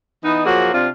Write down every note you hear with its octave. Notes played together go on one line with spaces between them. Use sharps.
E3 B3 D#4
F3 F#3 A#3 F#4 G#4
C3 C4 D4 F4